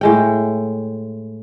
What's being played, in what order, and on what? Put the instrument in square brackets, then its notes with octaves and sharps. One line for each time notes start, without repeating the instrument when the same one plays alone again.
[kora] A2 G#3 G5